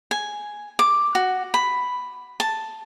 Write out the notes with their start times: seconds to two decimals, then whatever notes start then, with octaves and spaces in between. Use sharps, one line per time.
0.11 G#5
0.79 D6
1.15 F#4
1.54 B5
2.40 A5